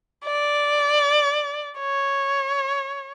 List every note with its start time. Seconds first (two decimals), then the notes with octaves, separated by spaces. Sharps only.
0.24 D5
1.79 C#5